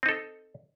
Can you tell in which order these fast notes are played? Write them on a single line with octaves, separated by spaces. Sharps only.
C4 D#4 A4